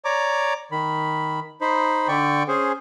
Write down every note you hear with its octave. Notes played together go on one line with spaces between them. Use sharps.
C#5 D5 A#5 D6
D#3 B5
D#4 C5 B5
D3 D5 G5 C#6
C#4 G#4 C5